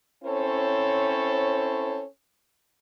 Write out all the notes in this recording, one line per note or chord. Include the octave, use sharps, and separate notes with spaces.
C4 C#4 E4 A4 C5 C#5